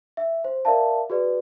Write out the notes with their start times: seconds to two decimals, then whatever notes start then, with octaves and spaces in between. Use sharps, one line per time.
0.17 E5
0.44 C5
0.65 A#4 D5 E5 F5 A5
1.10 F#4 G#4 B4 D5